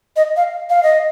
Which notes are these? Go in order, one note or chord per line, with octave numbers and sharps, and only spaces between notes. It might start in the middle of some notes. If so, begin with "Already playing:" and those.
D#5
F5
F5
D#5